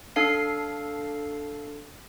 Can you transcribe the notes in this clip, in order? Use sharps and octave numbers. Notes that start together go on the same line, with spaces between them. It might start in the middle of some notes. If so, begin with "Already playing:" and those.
D4 A4 F5 C7